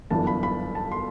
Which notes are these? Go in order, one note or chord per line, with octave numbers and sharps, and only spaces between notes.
G1 F#2 E3 B3 D4 A5
B5
B5
A5
C6